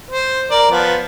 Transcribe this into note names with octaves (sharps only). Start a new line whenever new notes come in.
C5
A#4 D5
F3 B3